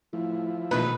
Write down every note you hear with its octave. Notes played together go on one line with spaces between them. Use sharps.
A2 F3 E4
A#1 B2 D#3 A3 B4